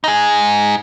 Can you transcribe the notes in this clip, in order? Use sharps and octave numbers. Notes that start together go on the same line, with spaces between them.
D#4 G#4